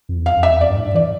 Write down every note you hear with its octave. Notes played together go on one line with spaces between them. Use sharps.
F2
E2
F2 F5
F2
E5
E2
F2 D5
G2
A2
G2
E3 D5